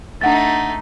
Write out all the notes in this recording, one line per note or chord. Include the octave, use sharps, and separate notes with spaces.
A3 D4 D#4 F#5 A6